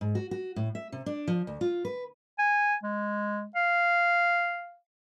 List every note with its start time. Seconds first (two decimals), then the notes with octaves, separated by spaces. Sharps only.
0.01 G#2
0.15 F#4
0.31 F#4
0.56 A2
0.75 E5
0.92 C3
1.06 D4
1.28 F3
1.47 D2
1.61 F4
1.85 B4
2.39 G#5
2.83 G#3
3.56 F5